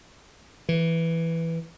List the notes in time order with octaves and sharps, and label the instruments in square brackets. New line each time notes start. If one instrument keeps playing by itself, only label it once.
[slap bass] E3